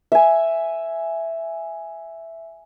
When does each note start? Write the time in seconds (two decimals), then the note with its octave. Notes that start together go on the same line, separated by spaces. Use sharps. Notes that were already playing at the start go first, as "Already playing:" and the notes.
0.12 E5 G#5